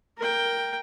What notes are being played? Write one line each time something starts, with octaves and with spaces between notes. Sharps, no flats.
A#4 G5